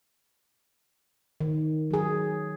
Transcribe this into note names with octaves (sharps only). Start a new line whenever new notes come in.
D#3
F#3 G#4